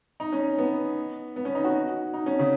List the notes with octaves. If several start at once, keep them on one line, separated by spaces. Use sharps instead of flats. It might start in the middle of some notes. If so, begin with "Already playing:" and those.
D#4
C#4
B3
B3
C#4
D#4
F#4
D#4
C#4
C#3